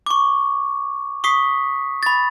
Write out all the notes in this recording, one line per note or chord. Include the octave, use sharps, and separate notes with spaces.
C#6 D6
C#6 D#6 B6 C7
B5 A6